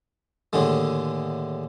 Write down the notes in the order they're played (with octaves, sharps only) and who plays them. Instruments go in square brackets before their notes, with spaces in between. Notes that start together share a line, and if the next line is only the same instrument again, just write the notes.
[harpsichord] D#2 A2 D3 G#3